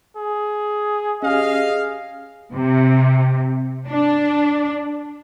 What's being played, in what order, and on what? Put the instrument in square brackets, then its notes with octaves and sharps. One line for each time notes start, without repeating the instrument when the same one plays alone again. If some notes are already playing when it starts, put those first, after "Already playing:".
[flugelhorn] G#4
[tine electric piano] C#4 G4 [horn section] G#4 F5 [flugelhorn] D#5
[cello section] C3
D4